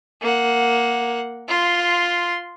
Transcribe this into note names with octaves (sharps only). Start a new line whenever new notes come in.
A#3 F#5
F4 C6